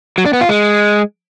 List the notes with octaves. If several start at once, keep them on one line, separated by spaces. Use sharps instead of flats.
F#3
D4
B3
F4
G#3